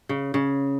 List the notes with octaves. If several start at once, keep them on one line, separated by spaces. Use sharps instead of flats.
C#3
C#3